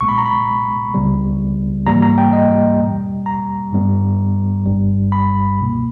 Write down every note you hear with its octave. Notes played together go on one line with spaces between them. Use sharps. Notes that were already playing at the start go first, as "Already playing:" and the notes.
B1 A#2 G#3 B3 C#6
B5
A#5
B5
C#2 C#3 G3 B3
G#2 E3 G3 A#3 A#5
A#5
G5
D#5
E2 B2 G3
A#5
G2 G3 B3
G1 G2 G3
B5
C#2 B2 A#3